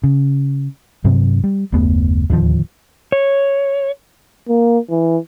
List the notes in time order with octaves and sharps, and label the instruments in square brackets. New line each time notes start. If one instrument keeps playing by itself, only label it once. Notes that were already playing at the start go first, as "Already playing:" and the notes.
[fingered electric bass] C#3
G2 C3 F#3 C4
G3
F#1 D#2 A3 B3
D1 D#2 D3 F3
[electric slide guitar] C#5
[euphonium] A#3
E3